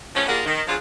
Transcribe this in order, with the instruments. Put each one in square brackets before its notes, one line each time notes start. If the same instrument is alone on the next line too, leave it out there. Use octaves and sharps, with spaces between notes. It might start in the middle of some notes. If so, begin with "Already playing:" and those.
[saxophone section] F3 A3 B3 C#4
G3 A#3 F4 G#4 F5 F#5
D#3
F3 F#3 D4 F4 G#4